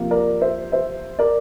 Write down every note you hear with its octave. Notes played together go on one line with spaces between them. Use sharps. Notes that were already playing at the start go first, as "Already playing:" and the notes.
Already playing: C3 F3 A#3
A#4 D5
C5 E5
C5 E5
A#4 D5